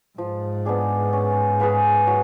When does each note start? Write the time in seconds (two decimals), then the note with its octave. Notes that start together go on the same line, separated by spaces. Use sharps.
0.18 G#2 F3
0.66 B3 D4 G#4
1.13 C#4
1.60 G#4 B4 F5
2.07 F#3